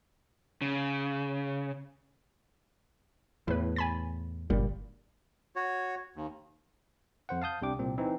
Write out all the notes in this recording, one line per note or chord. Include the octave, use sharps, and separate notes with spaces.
C#3
E2 A2 E4 B4
G#5 B5 A6
G1 G2 A#2 G3
F#4 C#5
D#2
F2 C5 F#5
F5 A5 D#6 G6
C2 C3 D4 G5 D6
C2 A#2 C4
E3 C4 D#4